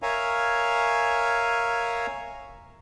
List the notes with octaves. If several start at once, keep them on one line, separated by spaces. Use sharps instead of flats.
A#4 C#5 E5 F5 G#5 A#5